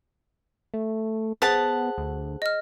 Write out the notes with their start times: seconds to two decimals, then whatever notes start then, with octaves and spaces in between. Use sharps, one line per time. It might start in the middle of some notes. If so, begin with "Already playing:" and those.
0.74 A3
1.42 B3 G#4 C5 F#5 A5 B6
1.98 D2
2.42 D#5 F6